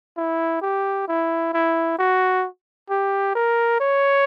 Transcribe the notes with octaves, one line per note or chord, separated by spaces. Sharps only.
E4
G4
E4
E4
F#4
G4
A#4
C#5